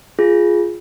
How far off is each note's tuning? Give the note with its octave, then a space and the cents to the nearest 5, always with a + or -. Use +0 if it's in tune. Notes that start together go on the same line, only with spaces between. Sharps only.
F4 +0 G#4 +0